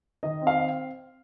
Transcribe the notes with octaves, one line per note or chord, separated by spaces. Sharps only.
D#3 D#5
C4
F5